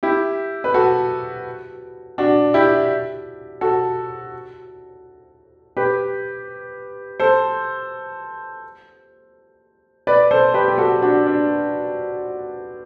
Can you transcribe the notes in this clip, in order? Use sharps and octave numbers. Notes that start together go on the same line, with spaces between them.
E4 G4
B4
F#4 A4
D4 F#4
E4 G4
F#4 A4
G4 B4
A4 C5
B4 D5
A4 C5
G4 B4
G4
F#4 A4
D4 F#4
D4